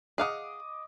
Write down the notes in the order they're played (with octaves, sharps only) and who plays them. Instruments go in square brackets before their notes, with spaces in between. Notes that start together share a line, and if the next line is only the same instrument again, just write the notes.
[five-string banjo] G#4 F5 F#5 [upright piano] D#5 D6 D#6